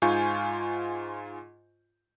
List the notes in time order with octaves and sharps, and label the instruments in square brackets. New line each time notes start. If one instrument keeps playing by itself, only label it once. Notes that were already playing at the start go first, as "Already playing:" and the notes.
[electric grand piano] G#2 F4 G#5 C#6 G6